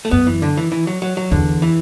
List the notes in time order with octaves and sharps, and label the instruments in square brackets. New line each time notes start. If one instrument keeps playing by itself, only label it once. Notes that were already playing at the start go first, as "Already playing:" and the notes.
[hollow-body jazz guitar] A3
[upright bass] F#2 [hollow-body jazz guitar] B3
[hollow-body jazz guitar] E3
D3
E3
E3
F#3
F#3
F#3
[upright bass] E2 [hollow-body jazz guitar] D3
[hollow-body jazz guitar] E3